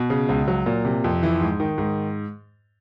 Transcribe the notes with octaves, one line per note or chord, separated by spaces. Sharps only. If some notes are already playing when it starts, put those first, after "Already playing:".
Already playing: B2
C#3
C#2
F#3
A#2
C3
F2
E3
G#2
D#3
G#2